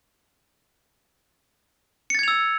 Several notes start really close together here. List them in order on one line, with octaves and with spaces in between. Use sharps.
C#7 A6 G#6 F7 E6